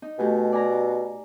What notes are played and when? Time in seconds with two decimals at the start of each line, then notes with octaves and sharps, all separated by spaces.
0.02 D#4
0.19 B2 A3 G4 G#5
0.52 D5 G#5 A#5